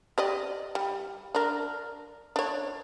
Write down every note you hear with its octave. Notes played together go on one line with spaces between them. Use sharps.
G4 D5 D#5
G3
D4 A#4
D4 C#5